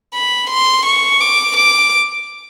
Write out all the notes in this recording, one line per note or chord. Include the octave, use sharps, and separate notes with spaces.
B5
C6
C#6
D6
D6